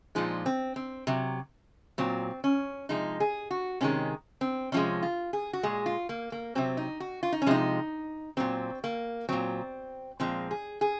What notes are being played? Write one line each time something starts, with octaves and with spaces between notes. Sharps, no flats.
A#2 F3 G#3 D#4
C4
C4
C3 F#3
A#2 F#3 C4
C#4
C3 F3 G#3 D#4
G#4
F#4
C3 D#3 G#3 C#4
C4
C3 F3 G#3 C#4
F4
G#4
F#4
A#2 G#3 G#4
F4
A#3
A#3
C3 F#3 C4
D#4
F#4
F4
D#4
C#4
C3 F3 G#3 D#4
A#2 F#3 C4
A#3
A#2 F#3 C4
A#2 F3 G#3 C4
G#4
G#4